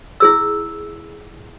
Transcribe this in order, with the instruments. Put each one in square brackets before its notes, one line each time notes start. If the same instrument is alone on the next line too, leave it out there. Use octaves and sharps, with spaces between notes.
[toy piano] E4 G#4 E6